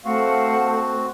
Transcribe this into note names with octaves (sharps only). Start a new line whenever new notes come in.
A3 C4 F#4 C5 F5 F#5